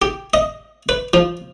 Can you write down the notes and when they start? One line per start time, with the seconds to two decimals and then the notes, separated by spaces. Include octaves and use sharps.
0.02 G4
0.34 D#5
0.89 B4
1.14 F3